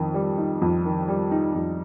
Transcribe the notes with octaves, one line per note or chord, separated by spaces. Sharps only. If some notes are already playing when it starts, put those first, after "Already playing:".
Already playing: F2 D#3
G3
D#4
F2
D#3
G3
D#4
F2